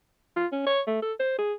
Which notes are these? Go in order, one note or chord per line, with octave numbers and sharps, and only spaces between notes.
F4
C#4
C#5
A3
A4
C5
G#4